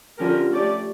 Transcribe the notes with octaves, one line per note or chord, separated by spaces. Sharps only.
D3 F3 C#4 G4 A#4
A3 C#4 G4 D5